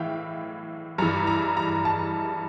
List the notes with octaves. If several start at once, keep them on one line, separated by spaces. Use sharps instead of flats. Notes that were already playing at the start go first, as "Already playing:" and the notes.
Already playing: A2 E3 E5 F5 G5
G2 E3 A#5
A#5
A#5
A5